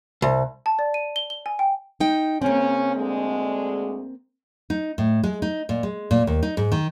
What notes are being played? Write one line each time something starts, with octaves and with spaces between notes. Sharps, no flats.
C2
A5
D5
D#7
G7
G7
G#5
G5
D#4 G5
C#3 A#3 C4 C#4
D2 D3 G#3
D#4
A2
G#3
D#4
A#2
G#3
A#2
D#2
D#4
G#2
D#3